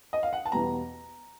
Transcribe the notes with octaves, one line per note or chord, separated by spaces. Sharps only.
D#5
F5
F#5
A5
E2 B2 G3 B3 A#5